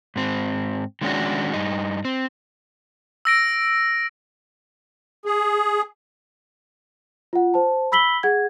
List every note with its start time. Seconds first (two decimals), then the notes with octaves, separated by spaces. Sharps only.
0.16 G#2 C4
1.01 D#3 G#3 C#4 D4 F#4
1.53 G2 D#4
2.05 C4
3.25 E6 A#6 D7
5.25 G#4
7.33 F4 F#5
7.54 C5 A5
7.92 B5 E6 B6 F#7 G7
8.23 G#4 F#5 G#6